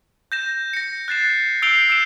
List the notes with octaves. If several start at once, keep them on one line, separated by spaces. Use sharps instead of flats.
G6 A#6 E7
A#6 C#7
F#6 A6 C7 E7
E6 G6 C7 D7 F7 G7
E6 D7 E7